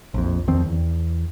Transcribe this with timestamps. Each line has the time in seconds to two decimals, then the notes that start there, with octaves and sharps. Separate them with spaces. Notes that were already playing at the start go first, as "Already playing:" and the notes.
0.14 A#1 F2
0.48 E2 D#3 F3 C4
0.66 E2